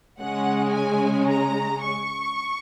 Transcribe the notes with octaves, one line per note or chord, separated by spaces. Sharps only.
C#3 G#3 C#4 F#5
G#5
A#5
C#6